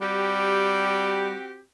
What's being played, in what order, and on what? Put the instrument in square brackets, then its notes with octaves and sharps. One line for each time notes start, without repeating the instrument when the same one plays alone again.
[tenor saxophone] G3 [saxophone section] C4 F#4 G4